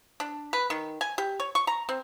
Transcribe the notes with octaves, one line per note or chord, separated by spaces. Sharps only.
D4
B4
D#3
G#5
G4
C#5
C#6
A#5
C4